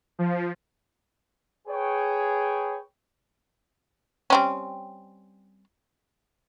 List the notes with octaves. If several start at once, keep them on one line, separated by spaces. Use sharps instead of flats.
F3
G#4 B4 C#5 G5
G3 C4 C#4